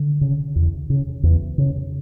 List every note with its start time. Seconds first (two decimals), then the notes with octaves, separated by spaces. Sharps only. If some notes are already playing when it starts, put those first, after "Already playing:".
Already playing: D3
0.21 C#3
0.56 E2
0.90 C#3
1.23 E2
1.58 C#3